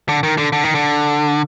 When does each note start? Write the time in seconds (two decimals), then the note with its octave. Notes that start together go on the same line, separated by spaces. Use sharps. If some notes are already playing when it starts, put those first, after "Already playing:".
0.09 D3
0.23 D#3
0.38 D3
0.52 D3
0.64 D#3
0.75 D3